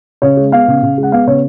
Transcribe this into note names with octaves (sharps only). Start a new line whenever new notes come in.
C#3 C#5
G#3
B3 F5
C#3
C#3
G#3
F#5
B3 F5
C#3 C#5